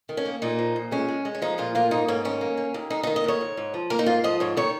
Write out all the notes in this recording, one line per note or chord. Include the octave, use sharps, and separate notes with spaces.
D#3
C#4
A#3
A#2 D#4
F3
A#2
G#3 C#4
G#3
G#3
C#4
F3 D#4
A#2 F4
A#3 F4
G#2 D#4
G#2 C#4
D#3 C#4
A#3
A#3
D#2
D#2 D#4
D#3 D#4
D#5
D#2 C#5
G#2
G#2
F3
A#3 A#4
D#4
G#2 F4
F3 D#5
G#2 C#5
D#3 C#5